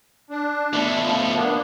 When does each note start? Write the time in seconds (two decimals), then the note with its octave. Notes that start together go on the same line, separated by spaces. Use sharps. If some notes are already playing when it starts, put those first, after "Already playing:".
0.30 D4
0.73 B2 A3
1.00 F3
1.34 A#3 B3 D4